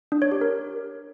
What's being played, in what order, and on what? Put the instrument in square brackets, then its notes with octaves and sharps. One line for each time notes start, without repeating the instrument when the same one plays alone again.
[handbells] D4
C#5
G4
A#4